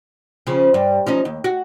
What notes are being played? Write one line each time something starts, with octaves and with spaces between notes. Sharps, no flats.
C#3 F3
G2
F3 C#4 D#4
D#2
F#4